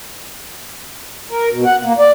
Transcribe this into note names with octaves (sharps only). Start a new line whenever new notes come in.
A#4
B2
F#5
A#3
D5